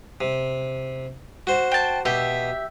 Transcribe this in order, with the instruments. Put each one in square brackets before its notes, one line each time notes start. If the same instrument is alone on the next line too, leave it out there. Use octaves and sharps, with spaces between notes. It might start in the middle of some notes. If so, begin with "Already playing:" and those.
[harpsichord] C3
F#4 C5
[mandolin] G5 A5
[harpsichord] B2 [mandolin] G4 E5